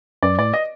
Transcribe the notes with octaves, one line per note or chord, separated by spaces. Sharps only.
F#2 D5
A2 D5
D#5